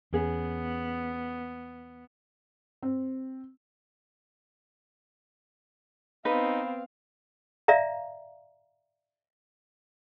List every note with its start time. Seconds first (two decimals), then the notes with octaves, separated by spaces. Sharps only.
0.13 E2 B3 C#4 G#4
2.83 C4
6.25 B3 C4 D#4 B4 F5
7.68 D5 E5 F5 A#5